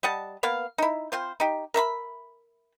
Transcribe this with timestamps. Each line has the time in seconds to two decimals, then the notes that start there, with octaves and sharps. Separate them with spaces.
0.03 G3 D#5 F#5 A5
0.43 A#3 B3 F5
0.78 D#4 E4
1.12 C4 F4 C5
1.40 D#4 G4
1.74 A#4 E5 A#5 B5